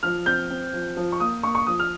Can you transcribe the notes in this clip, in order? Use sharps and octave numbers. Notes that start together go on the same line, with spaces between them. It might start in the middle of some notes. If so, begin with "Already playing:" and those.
F3 F6
C4 G6
C4
F3
F3
C#6
A#3 D#6
A#3 C#6
C#6
F3 D#6
F6